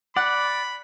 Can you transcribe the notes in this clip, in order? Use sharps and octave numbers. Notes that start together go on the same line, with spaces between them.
D5 F#5 B5